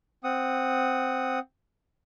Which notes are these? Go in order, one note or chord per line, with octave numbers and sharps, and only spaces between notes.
C4 F#5 D#6